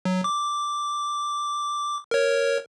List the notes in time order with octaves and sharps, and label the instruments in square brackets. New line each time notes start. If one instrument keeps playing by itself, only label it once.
[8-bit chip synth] F#3
D6
A#4 C#5